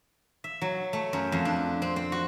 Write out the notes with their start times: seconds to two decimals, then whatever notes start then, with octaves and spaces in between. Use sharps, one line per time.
0.44 E5
0.61 F#3
0.93 A3
1.13 F#2
1.32 F2
1.45 D4
1.82 C4
1.96 C4
2.12 F#4